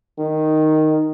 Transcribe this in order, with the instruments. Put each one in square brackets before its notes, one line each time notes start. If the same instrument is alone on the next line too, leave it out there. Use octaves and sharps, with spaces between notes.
[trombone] D#3